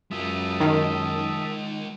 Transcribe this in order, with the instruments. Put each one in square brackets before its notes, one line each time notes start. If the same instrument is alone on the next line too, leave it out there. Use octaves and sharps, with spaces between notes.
[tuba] F#2 [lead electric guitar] G#3 F4 [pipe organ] E5 A5 D#6
[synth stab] D#3